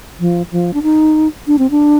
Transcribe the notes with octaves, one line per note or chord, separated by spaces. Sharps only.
F3
F3
D4
D#4
D4
C4
D4